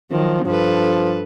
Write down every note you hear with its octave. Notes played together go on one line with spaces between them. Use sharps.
D#3 F3 F#3
G2 F3 A4 B4